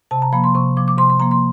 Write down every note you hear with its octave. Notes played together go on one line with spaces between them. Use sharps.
C3 A5
A#5
F3 A#3 B5
C6
C3 C#6
F3 A#3 D6
D6
C3 C6
C6
F3 A#3 A#5
C6